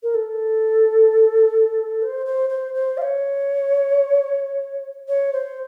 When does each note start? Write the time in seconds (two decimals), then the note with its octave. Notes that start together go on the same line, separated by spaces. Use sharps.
0.03 A#4
0.14 A4
2.02 C5
2.25 C5
2.49 C5
2.74 C5
2.97 F5
3.01 C#5
5.08 C#5
5.33 C5